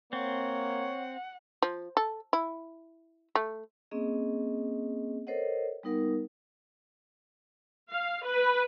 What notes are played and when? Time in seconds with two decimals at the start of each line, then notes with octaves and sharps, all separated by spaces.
0.13 A#3 C4 C#5 F#5
1.62 F3
1.97 A4
2.33 E4
3.35 A3
3.91 A#3 C4 C#4 G#4 D#5
5.27 A4 A#4 C5 C#5 D#5 F#5
5.83 G3 B3 D#4 A#4 F#5
7.91 F5
8.24 B4